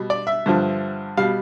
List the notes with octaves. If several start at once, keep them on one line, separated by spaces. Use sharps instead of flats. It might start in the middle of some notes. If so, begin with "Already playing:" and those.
Already playing: B2 G3
D5
E5
G2 D3 F3
B2 G3 F5